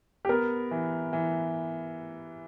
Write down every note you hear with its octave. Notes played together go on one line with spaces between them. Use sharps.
G4
B3 A#4
E3
E3